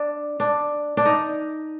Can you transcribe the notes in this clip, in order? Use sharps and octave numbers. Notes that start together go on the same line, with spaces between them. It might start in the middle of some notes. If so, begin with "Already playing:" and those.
Already playing: D4
D4
D4
D#4